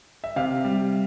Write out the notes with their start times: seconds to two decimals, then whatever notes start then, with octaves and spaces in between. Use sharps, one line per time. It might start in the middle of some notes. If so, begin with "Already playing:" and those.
0.24 E5
0.36 C3 F5
0.64 G3